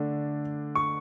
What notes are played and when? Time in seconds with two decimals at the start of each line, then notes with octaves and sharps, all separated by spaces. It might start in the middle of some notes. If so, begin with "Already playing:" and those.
Already playing: D3 A3 D4
0.75 C#6